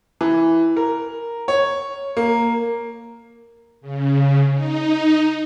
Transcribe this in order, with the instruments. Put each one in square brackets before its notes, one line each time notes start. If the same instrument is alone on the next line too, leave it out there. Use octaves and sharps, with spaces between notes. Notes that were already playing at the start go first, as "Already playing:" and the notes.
[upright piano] E3
A#4
C#5
A#3
[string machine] C#3
D#4